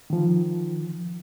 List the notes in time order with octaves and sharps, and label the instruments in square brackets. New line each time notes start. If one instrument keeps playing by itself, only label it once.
[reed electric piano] D#3 F3